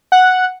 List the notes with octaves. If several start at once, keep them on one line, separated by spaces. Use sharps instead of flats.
F#5